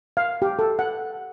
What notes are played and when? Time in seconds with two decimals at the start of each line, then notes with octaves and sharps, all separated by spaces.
0.17 F5
0.42 G4
0.59 A4
0.79 F#5